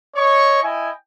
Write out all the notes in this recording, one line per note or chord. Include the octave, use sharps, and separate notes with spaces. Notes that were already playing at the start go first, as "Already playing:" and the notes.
C#5 D#5 C#6
E4 D#5 G5 G#5